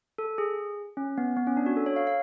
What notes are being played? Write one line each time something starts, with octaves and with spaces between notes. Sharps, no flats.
A4
G#4
C#4
B3
B3
C#4
D4
F#4
A4
C#5
F5
F5